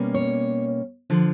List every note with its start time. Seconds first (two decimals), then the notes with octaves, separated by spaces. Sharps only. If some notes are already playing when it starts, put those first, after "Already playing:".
Already playing: B2 G3 A#3 C#4
0.14 C#5
1.10 D3 F3